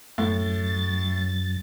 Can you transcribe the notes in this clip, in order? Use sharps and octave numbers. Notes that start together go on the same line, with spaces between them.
F#2 A2 A6